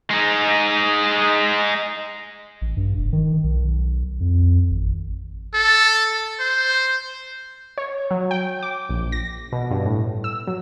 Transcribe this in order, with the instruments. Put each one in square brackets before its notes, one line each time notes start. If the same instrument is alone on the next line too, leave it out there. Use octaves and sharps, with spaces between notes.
[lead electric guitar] G#3 D#4
[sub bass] A1
G2
F1
D#3
B1
F2
G#1
[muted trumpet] A4
C5
[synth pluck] C#5
F#3
G5
D6
A#1
A#6
B2
G2
A2
E6
F#3